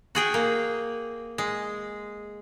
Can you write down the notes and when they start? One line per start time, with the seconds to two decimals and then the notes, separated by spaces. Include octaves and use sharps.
0.15 F#4 G#4 G5
0.34 A#3
1.38 G#3